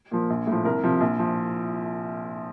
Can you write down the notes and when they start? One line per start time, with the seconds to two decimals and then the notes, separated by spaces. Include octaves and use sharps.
0.11 A#2 F3
0.30 A#1
0.47 A2 F3
0.65 C2 A#4
0.83 C3 F3
1.00 A#1
1.19 F3